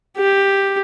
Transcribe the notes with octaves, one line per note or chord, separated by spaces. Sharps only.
G4